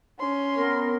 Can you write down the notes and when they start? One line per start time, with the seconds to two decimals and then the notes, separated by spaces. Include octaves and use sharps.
0.19 C#4 C6
0.56 B3 C4 A#4